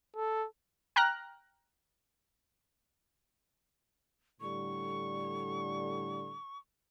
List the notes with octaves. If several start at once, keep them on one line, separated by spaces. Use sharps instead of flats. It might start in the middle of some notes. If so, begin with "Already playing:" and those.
A4
G5 A#5 F6 F#6 A#6
A2 D3 G3 C#6